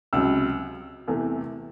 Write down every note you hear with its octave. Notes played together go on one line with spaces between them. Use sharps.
C#2 C3 F#3 E6
E2 C3 E3 A3